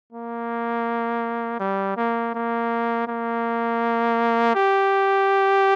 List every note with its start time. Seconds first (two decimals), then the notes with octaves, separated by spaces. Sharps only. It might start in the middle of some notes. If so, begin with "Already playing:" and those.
0.13 A#3
1.60 G3
1.97 A#3
2.35 A#3
3.08 A#3
4.55 G4